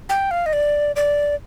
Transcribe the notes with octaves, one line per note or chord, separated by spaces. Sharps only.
G5
F5
D#5
D5
D5